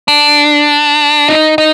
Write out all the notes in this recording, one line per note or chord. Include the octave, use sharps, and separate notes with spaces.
D4
D#4
D#4